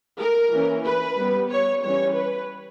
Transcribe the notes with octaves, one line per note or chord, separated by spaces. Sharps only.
A#4
E3 A#3 C#4
B4
G3 B3
C#5
E3 G3 C#4 C#5
B4